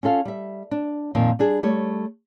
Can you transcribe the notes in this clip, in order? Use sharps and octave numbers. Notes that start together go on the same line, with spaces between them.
C#4 F4 A4 F5
G3 E5
D4
F2 A#2 D#3 F3
G3 D4 G#4
G3 A3 C#5